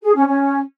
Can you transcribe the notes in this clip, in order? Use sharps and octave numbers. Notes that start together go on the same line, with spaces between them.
G#4
C#4
C#4